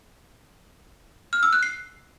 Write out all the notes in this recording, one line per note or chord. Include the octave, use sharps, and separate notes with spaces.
F6
E6
F#6
C7